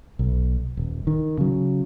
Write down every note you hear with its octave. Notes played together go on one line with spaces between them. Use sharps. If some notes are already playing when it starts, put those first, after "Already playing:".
B1
D#1
D#3
C#3 F#3